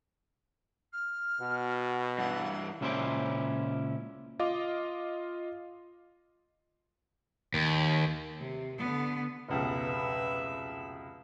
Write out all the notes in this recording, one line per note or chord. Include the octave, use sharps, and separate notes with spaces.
F6
B2 F#4
G2 E3 F#5
C#2 A#2 C#4 E4 C5 D5
F4 D#5 F5 D6
D#2
C3
D3 B3
F1 C#2 B2 B4 E5